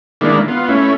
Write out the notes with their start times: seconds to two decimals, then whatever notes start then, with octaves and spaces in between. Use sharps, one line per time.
0.21 D#3 G#3 A#3 D4 E4
0.48 B3 F4
0.69 A3 C#4 E4